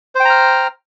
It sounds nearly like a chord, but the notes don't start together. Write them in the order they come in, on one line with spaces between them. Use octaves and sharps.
C5 G5 A#5 F6